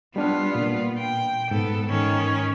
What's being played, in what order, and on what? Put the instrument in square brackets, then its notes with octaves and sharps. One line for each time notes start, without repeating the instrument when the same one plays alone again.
[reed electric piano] G3 D4 F6 [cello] B3 F4
[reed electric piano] A#2
[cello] G5
[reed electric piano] G#2 [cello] B3 A4
[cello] D#3 C#4